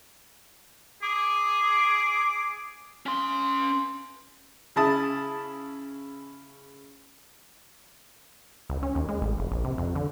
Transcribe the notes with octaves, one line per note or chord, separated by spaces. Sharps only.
G#4 D6
C#4 C6
C#3 E4 A5 D#6
C#2
C#4
D#2
G#3
A1
F1
A#1
C3
F2
D3